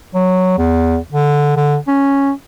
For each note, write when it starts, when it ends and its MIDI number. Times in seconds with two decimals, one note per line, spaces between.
0.15 0.55 54
0.58 0.98 40
1.12 1.53 50
1.56 1.77 50
1.88 2.32 61